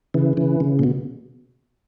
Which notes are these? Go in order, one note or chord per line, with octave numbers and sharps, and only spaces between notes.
C#3 E3
C#3 E3
C#3
A#2
B2